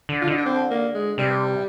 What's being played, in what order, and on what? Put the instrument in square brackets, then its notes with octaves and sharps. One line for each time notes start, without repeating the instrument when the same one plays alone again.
[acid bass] D3
[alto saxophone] F4
[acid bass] D3 [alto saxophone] D#4
[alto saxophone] D4
C4
A#3
G#3
[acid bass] C3 [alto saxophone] G3